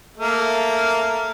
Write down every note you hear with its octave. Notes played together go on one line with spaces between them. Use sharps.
A3 A#3